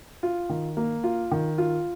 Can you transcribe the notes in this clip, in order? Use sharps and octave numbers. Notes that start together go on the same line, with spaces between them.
F4
D#3
A#3
F4
D#3
F4